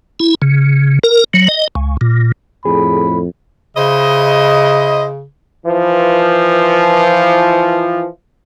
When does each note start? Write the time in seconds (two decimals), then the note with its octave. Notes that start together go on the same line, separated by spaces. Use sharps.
0.20 E4
0.42 C#3
1.03 A#4
1.34 F#3
1.48 D#5
1.75 C#2
2.01 A#2
2.65 F2 A2 G#4 B5
3.77 C#3 E4 C5 D#5
5.65 E3 F3